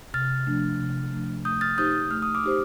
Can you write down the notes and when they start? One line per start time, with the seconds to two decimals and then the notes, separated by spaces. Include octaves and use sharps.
0.14 C3 F6 A6
0.47 F3 A3 D4
0.80 C3
1.12 F3 A3 D4
1.45 A3 D#6 G6
1.61 F6 A6
1.78 D#4 G4 C5 D#6 G6
2.11 A3 F6
2.22 D#6
2.35 D6 F6
2.44 D#4 G4 C5